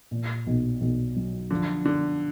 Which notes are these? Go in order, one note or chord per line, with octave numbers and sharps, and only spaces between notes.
A#2
B1
B1
F#3
D3 F3
D3 D4